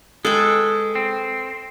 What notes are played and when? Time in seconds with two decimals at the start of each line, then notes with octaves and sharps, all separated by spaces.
0.25 G#3 A4 B4 G5
0.95 C4